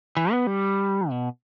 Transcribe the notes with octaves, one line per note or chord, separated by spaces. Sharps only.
E3
B3
G3
B2